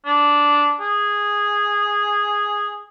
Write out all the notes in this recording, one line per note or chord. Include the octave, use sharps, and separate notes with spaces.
D4
G#4